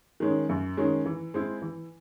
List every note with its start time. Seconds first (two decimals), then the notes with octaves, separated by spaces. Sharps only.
0.20 D#3 G#3 C#4
0.49 F#2
0.77 D#3 G#3 C#4
1.06 E3
1.34 G#3 C4 E4
1.62 E3